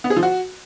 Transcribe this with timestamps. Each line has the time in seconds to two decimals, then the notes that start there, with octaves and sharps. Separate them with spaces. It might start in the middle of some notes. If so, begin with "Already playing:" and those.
0.04 B3
0.10 G#4
0.16 F3
0.23 F#4